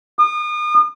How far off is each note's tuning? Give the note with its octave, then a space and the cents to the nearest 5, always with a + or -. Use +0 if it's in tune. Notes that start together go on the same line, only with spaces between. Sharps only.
D#6 -40